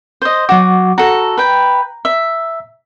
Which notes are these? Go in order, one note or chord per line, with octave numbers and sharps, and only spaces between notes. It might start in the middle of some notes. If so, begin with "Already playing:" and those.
C5 D#5
F#3 F#4 F#5 D6
F#4 A4 A#5
B4 G5
E5